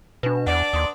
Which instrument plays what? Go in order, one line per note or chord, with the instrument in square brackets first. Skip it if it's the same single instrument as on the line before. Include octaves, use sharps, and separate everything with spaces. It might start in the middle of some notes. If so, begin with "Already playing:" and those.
[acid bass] B2 [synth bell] D4 B4
[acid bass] E2 [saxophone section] D4 D5 [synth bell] F#5
[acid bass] D#2 [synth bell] C6 D#6